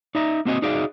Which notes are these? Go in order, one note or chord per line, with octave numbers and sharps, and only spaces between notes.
D#4 D5 E5 A#5
A#3 C4 F#4 D#5 G#5
D#4 F#4 G#4 D5 E5 F5